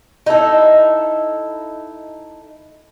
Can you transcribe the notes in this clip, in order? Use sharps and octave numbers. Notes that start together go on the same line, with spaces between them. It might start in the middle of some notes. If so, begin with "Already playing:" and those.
D#4 E4 A4 E5